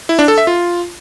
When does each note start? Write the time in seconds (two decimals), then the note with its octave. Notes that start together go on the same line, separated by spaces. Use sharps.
0.09 E4
0.19 D4
0.28 A4
0.38 E5
0.47 F4